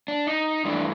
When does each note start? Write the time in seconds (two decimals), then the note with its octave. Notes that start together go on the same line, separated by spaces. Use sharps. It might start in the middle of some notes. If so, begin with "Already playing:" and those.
0.08 D4
0.27 D#4
0.65 G2 E3 A3 D4